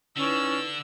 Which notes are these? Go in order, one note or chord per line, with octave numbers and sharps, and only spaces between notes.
D3 C#4 D#4 E4 B4 E6